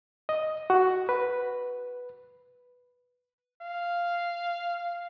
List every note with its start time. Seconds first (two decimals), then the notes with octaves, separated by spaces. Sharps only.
0.29 D#5
0.70 F#4
1.09 B4
3.62 F5